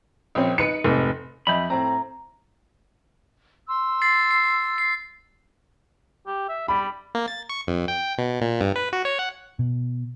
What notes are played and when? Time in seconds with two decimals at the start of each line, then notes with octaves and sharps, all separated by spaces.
0.35 A#1 C4 C#4
0.58 D#4 B4 C#7
0.84 F1 G#2
1.47 F2 D#5 E5 B5 G6
1.70 A2 C4 A#5
3.69 C6 E6
4.02 A6 C7
4.31 C7
4.78 C7
6.27 G4
6.49 E5
6.68 G3 B5
7.15 A#3
7.28 A6
7.49 C#6
7.67 F2
7.88 G5
8.18 B2
8.41 A#2
8.61 G2
8.76 B4
8.93 F#4
9.05 C#5
9.19 F#5
9.59 B2